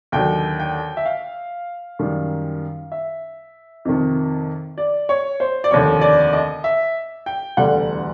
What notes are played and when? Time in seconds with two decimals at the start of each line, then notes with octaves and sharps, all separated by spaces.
0.12 D#2 D3 F#3 G5
0.60 G5
0.97 E5
1.05 F5
1.99 F#2 D#3 G3
2.92 E5
3.85 F2 C3 D#3
4.78 D5
5.09 C#5
5.40 C5
5.64 D5
5.71 F1 D#2 D3 C#5
6.01 D5
6.33 D#5
6.64 E5
7.26 G5
7.57 E1 D2 D3 G3 F#5